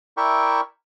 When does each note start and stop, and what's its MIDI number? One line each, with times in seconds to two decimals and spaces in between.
0.17 0.60 64
0.17 0.60 70
0.17 0.60 74
0.17 0.60 76
0.17 0.60 79
0.17 0.60 85